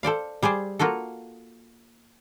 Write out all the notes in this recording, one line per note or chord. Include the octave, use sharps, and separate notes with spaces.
A4 C5 D5 F5
G3 G#4 C5 D5
A#3 F4 F#4 A4